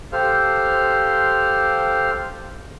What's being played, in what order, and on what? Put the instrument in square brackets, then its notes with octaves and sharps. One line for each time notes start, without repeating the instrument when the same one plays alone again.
[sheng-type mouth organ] G4 A4 C5 F5